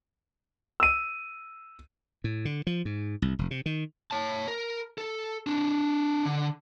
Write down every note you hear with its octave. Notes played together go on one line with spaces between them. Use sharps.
E6 D#7
A2
D3
F3
G#2
C2
F1
C3
D#3
C#5 A5
A#4
A4
C4 D4
D3